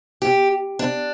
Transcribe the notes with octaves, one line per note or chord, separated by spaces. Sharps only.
G4
D4